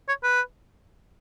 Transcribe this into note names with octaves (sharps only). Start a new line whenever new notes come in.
C#5
B4